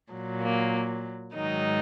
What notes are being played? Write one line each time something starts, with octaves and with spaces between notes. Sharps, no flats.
A#2 F#3
A#3
G#2 D#3 F#3 D#4